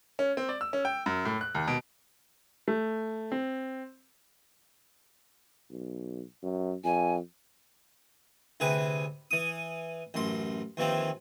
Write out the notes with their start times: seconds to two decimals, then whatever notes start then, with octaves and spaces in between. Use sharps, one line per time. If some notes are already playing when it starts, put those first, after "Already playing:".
0.19 C#4
0.37 C4
0.49 D5
0.61 E6
0.73 C#4
0.85 G5
1.06 F#2
1.25 A2
1.41 F#6
1.55 D#2
1.68 B2
2.68 A3
3.32 C4
5.70 B1
6.43 F#2
6.84 F2 G#5
8.60 D2 C3 G#4 B4
9.31 E3 D#6
10.14 A1 F#2 C6
10.77 D#2 E3 F3 C4